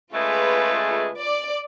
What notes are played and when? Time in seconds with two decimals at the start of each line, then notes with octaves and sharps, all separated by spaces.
0.12 C#3 G#3 A3 F4 B4
1.19 D5 D6